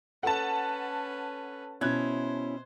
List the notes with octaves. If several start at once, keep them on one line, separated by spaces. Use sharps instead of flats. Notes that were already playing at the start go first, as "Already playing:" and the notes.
C#4 A4 B4 F#5 A5
B2 C#4 E4 C5 F#6 G#6